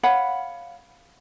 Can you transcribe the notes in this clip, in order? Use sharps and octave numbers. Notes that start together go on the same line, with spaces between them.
C#5 F5 F#5 B5